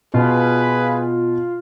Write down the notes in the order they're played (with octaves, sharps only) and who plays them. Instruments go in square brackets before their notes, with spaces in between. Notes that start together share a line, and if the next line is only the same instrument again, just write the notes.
[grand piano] B2 [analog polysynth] F4 [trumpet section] G#4 B4